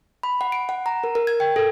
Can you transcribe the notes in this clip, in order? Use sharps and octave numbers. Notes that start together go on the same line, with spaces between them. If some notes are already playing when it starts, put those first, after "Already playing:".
B5
F#5
D7
F#5
A#5
A#4
A#4
G#6
G5
A4